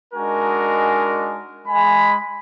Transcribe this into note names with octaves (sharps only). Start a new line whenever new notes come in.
G#3 D4 D#4 F#4 A#4 G#5
G#3 G#5 B5